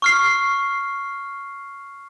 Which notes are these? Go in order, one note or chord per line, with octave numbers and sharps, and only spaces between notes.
C#6 F6 C7